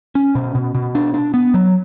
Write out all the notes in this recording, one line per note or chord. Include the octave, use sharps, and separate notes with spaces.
C#4
B2
B2
B2
D4
D4
B3
F#3